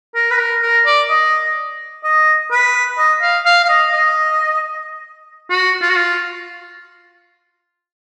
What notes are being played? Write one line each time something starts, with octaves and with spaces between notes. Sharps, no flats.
A#4
B4
A#4
A#4
D5
D#5
D#5
B4
D#5
F5
F5
F5
D#5
D#5
F#4
F4
F#4
F4